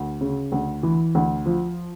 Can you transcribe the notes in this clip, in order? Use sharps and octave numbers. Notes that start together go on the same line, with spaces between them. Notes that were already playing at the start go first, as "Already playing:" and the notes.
Already playing: D2
C#3
D2
E3
D2
F3